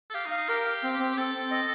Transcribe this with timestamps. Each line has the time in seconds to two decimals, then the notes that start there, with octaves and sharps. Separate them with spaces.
0.10 A4
0.14 G4 F5
0.26 D#4
0.31 F5
0.37 D#4
0.49 G4 A#4
0.66 F5
0.83 C4
0.99 C4
1.17 C4 A4
1.34 C4
1.51 D#5